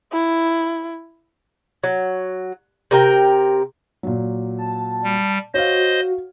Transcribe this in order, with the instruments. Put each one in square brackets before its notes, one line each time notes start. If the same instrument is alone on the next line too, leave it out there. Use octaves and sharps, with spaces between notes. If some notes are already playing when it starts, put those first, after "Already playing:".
[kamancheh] E4
[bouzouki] F#3
C3 A#4 G5
[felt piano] A#2 F#3
[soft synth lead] A5
[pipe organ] G3
[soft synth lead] F#4 [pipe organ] C5 D#5 [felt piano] C#5 F5